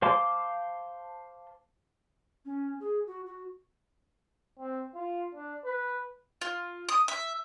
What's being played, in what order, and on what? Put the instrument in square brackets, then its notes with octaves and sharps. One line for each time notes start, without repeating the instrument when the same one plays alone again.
[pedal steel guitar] C5 F5 A5 C6 D6
[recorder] C#4
G#4
F#4
F#4
[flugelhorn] C4
F4
D4
B4
[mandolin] F4
D#6
E5